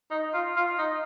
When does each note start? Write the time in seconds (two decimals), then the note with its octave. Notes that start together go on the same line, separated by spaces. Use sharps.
0.11 D#4
0.34 F4
0.56 F4
0.79 D#4